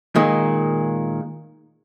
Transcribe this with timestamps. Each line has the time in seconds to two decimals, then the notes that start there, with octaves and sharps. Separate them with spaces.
0.15 A#2 D#3 G#3